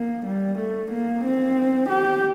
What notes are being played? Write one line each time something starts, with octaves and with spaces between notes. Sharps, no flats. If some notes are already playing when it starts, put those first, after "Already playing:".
Already playing: A#3
G3
A3
A#3
C4
G4